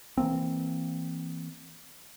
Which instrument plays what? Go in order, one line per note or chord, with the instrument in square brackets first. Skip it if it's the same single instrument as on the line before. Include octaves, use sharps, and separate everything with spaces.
[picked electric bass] E3 F3 A#3 C4